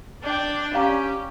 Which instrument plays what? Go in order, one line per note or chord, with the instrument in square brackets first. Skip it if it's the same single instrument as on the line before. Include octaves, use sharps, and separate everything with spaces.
[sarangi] D4 [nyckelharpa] D5 G5
[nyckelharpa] C#4 [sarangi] G4 [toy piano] D5 F5 A#5